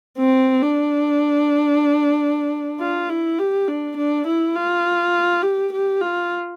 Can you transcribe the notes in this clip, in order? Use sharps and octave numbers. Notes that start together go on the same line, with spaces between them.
C4
D4
F4
E4
G4
D4
D4
E4
F4
G4
G4
F4